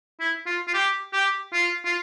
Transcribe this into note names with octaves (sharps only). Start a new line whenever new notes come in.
E4
F4
F4
G4
G4
F4
F4